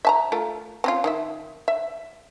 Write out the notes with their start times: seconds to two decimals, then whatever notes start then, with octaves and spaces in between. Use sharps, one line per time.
0.05 E5 A5 A#5
0.32 A3 F4 A#4
0.84 C4 C#4 F4
1.04 D#3 D#4 E5
1.68 E5